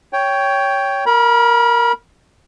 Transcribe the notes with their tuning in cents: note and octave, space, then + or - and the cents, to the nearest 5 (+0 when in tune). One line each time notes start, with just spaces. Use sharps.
C#5 +10 G5 +0
A#4 +0 B5 -35